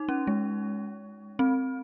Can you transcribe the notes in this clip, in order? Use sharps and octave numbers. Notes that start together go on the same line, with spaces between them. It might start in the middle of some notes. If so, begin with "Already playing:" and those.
Already playing: D#4
C#4
G#3
C4